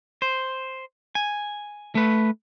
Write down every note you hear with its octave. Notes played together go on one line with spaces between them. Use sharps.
C5
G#5
A3 B4